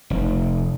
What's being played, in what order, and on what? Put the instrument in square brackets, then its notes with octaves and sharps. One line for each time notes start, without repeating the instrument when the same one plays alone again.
[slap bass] F1